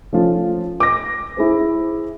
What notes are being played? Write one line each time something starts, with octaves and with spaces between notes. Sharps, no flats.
F3 A3 C#4 F4
D6 A#6
E4 G#4 C5